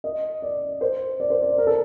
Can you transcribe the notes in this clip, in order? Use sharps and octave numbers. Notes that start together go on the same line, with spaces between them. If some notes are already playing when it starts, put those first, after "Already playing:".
D#5
D5
C5
D5
C5
D5
A#4
A4